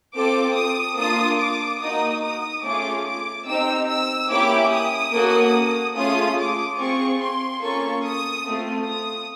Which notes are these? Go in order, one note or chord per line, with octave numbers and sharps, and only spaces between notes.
C4 F4 A4 D6
D#6
A#3 D4 F4 D#6
D6
A#3 D#4 F#4 D#6
D#6
A3 C#4 F4 G#4 D6
D6
C4 D#4 G4 E6
E6
A#3 C#4 E4 G4 D6
D#6
A#3 C#4 F#4 A4
A3 C#4 F4 G#4 D#6
D6
C4 F4 G#4 C#6
C6
A#3 C#4 F4 A4 C#6
D#6
A3 C4 F4
D#6